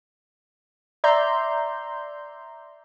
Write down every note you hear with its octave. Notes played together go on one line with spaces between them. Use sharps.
D5 E5 A#5 C6 G6